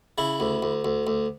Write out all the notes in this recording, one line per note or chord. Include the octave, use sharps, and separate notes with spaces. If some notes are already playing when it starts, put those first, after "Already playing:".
C#3 E4
D2
D2
D2
D2